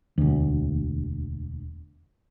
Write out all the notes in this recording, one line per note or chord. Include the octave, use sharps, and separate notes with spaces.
E1 D2